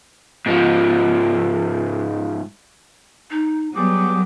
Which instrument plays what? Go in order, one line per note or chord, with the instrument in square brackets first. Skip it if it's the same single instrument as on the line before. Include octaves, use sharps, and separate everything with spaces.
[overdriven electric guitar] G#2 F3
[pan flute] D#4
[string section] F#3 B3 [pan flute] G3 [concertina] G4 G#4 D6